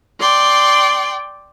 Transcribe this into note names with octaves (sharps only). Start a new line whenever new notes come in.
D5 G5 C6